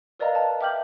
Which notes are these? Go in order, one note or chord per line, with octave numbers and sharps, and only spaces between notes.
A#4 B4 D5 D#5 F5 A#5
A5
E5 G5 D6 F6 G6 F#7